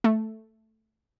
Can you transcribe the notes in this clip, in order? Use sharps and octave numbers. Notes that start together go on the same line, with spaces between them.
A3